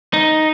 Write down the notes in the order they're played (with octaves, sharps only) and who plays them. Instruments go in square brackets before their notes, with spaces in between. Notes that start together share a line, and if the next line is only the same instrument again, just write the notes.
[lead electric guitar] D#4